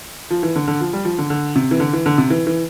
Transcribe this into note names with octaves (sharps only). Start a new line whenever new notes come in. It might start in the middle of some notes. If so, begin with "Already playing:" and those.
F3
E3
D3
D3
F3
G3
F3
D3
D3
C3
E3
D3
E3
D3
C3
E3
E3